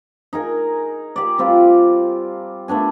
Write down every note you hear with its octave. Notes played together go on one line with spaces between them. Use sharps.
D#4 G#4 A#4
G4 D5
G3 C4 F4
A3 B3 D4 G#5